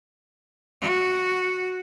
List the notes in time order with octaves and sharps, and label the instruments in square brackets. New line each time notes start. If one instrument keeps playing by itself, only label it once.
[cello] F#4